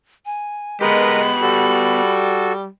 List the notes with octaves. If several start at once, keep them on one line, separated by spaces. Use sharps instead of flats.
G#5
G#3 B3 G4 A#4 B4 D#5 B5
G3 F#4 A4